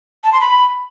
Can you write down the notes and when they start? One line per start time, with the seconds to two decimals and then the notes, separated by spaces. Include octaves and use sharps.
0.24 A5
0.32 C6
0.41 B5